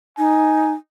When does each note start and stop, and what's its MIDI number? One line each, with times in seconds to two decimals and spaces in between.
0.18 0.73 63
0.18 0.75 80